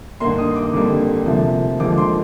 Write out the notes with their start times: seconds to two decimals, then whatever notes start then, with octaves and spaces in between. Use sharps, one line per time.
0.20 G2 D#3 A#3 C6
0.38 D#6
0.56 D6
0.73 F2 D3 G3 A#3
1.26 D2 C3 F3 A#3
1.80 D#2 D3 F3 G#3 D6
1.98 C6